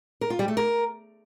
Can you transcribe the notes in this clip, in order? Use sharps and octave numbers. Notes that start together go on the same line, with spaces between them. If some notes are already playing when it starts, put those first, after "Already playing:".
A#4
F4
G3
A3
A#4